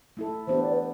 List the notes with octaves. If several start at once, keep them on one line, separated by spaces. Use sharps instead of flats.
A3 E4 A4
E3 B3 D4 G4 C5
D5
B4